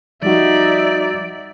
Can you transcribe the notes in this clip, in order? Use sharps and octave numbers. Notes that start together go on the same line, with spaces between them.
F3 G3 D#4 F#4 D5 E5